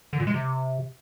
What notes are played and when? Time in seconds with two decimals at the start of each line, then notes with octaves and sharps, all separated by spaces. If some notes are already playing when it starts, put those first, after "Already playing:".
0.13 D3
0.20 A#2
0.27 G#3
0.34 C3